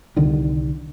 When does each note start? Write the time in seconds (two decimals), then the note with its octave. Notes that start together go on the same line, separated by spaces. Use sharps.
0.16 C2 D3 D#3